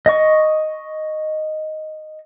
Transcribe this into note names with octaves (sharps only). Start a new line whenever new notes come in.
D#5 C#6